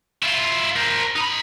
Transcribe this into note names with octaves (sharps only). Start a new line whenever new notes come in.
E4 F4
A#4 C5
D#4 B5